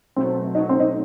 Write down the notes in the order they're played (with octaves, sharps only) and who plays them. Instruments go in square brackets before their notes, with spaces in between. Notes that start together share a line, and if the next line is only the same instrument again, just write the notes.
[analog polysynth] B2 F#3 A3 [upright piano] C4
[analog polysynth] B2 F#3 A3 [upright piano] D#4
[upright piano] C4
D#4